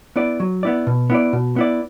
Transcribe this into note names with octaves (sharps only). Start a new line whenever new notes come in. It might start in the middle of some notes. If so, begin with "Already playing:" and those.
B3 E4 D5
F#3
B3 E4 D5
B2
B3 E4 D5
B2
B3 E4 D5